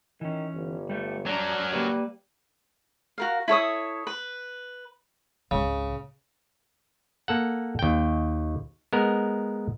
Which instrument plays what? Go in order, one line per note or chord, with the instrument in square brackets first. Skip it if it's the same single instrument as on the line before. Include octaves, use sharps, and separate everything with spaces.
[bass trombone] D#3 [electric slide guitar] E3 C#4
[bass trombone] G1
[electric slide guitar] G3 A3
[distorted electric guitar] F#3 A#4 [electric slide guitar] G3 [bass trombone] D4
[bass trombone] G3 [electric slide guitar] A#3 B4 D5
[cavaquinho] F#4 A#4 F5
E4 A4 C#5 D#6
B4
[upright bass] G#1 C#2 [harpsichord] C#3
[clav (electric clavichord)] A#3 A4 F#5
D#2 G5
G#3 B3 A#4